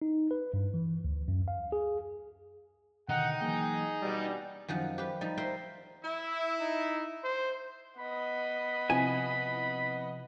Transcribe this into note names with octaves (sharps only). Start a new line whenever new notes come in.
D#4
B4
G2
E3
D2
F#2
F5
G#4
B2 D3 D#3 D#4 D#5 F#5 G5
E3 F#3 A#3 G#4
B2 G3 G#5
F#2 D#3 F3 F#5
G4 B4
F3 G3 D#4
A#4 C5 E5 G5
E4
D#4
C5
B3 D#5 B5
C3 F3 E4 G#5